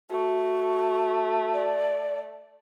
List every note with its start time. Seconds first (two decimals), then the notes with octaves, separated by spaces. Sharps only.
0.10 A3 F#4
1.53 D5